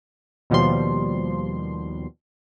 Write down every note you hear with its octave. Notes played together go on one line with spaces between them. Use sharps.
D#2 B2 F3 G3 C6